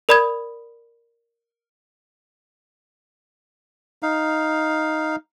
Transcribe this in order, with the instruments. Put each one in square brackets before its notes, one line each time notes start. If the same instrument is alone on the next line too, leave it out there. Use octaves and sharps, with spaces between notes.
[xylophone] A#4 D5 B5 D#6 G#6
[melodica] D#4 F5